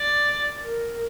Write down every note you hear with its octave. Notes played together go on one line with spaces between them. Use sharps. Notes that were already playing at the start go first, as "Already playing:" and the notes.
Already playing: D5
A#4